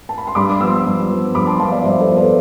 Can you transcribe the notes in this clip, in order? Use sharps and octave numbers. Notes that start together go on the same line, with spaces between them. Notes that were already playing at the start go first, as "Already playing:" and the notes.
A5
B5
C6
G2 B5 D6
F3 B3 C6 E6
G2
F3 B3
G2 B5 D6
A5 C6
F3 B3 F5 A5
D5 F5
G2 C5 E5
A4 C5
F3 B3
B4 D5